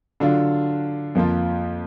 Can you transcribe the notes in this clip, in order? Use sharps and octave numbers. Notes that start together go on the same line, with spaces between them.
D3 F#3 D4 F4
F2 F3 A#3 F4